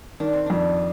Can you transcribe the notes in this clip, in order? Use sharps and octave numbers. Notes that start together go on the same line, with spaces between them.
D#3 D4
C4
F2 D4